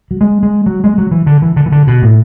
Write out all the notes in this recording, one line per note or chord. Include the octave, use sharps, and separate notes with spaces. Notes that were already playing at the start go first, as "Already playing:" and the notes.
F#3
G#3
G#3
F#3
G#3
F#3
E3
D3
E3
D3
E3
D3
B2
A2